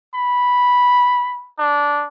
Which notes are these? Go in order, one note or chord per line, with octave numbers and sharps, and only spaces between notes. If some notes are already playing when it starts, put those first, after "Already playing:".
B5
D4